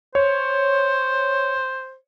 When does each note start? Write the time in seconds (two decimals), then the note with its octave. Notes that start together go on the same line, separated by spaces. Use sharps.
0.15 C5 C#5